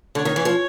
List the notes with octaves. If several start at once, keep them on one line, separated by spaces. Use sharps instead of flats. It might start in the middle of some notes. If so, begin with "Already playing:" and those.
D3 C#5
D#3
E3
F3